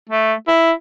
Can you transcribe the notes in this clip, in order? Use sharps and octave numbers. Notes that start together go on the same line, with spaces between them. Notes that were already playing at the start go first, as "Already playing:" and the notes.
A3
E4